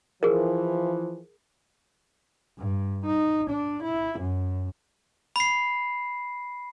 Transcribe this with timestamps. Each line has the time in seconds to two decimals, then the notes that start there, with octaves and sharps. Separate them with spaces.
0.23 E3 F3 G#4 A#4
2.58 G2
3.06 D#4
3.50 D4
3.83 E4
4.19 F#2
5.36 B5 C7